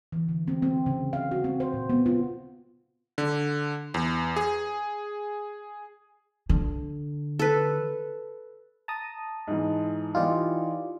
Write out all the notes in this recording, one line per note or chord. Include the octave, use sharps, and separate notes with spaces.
E3
D3
C4
C4
C#3
F5
F#4
C4
C5
A#2
B3
F4
D3
E2
G#4
D3
A4 B4
A5 A#5 D#6
G#2 E3
E3 D#4 F4 G4 D5